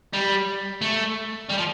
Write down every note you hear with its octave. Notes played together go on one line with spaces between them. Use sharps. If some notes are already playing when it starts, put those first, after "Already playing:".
G3
A3
G3
F3